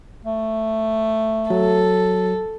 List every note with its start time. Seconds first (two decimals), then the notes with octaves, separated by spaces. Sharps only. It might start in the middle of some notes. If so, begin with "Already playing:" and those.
0.25 A3
1.50 F#3 A4